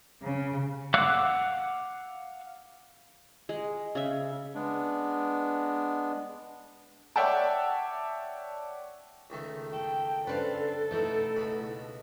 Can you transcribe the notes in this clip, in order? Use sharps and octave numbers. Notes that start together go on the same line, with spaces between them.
C#3
F5 F#5 D6 E6 F#6
G#3
C#3 E5
G#3 B3 D4
C#5 D5 E5 F#5 G5 A5
C#2 D#3 A3
A4 G5
C#3 D4 A4 B4 C5 F5
B2 A3 D#4 E4
C#2 B2 B5